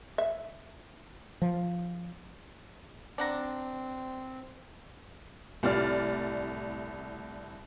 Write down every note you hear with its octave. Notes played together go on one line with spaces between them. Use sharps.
E5
F3
C4 D4 F#5 A#5
C2 A2 D5 F6 A6